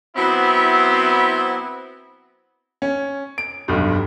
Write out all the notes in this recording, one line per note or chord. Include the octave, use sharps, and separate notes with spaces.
F#3 B3 C4 E4
C#4
D7
F1 B1 G2